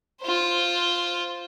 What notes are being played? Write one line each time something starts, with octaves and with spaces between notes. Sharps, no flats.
F4 C5